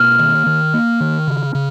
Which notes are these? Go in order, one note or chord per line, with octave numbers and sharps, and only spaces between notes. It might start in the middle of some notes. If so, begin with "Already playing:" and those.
Already playing: B2 A#3 F6
D#3
D#3
A#3
D#3
C#3
C#3